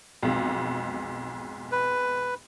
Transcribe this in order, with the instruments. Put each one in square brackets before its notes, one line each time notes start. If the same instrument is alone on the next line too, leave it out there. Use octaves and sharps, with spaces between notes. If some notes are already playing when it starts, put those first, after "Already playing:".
[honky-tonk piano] B1 F2 G#2
[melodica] B4